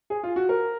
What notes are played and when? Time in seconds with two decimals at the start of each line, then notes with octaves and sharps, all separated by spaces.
0.10 G#4
0.23 F4
0.36 F#4
0.49 A#4